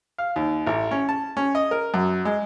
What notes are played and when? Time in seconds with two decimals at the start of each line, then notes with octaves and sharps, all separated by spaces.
0.18 F5
0.36 D#2
0.67 A1
0.91 C#4
1.09 A5
1.37 C#4
1.55 D#5
1.71 A#4
1.94 F#2
2.25 G#3